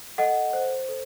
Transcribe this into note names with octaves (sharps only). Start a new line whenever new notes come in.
A4 D#5 F#5
C5
A4